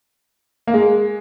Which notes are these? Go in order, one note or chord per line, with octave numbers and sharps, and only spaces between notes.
A#3
G#3